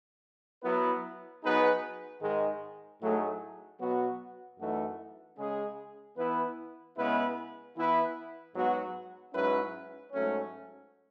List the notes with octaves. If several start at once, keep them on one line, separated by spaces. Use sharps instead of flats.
F#3 B3 E4 B4
F#3 B3 D#4 G#4 B4
G#2 D#3 G#3
A2 F#3 A3 D#4 G#4
B2 F#3 B3 F#4
F#2 E3 A3 D#4 F#4
C#3 G#3 C#4 G#4
E3 B3 E4 B4
C#3 G#3 B3 E4 B4
E3 B3 E4 B4
G#2 F#3 B3 F#4
G#2 F#3 C#4 E4 B4
G#2 F#3 A3 C#4